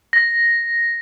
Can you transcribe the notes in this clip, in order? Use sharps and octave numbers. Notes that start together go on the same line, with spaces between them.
A#6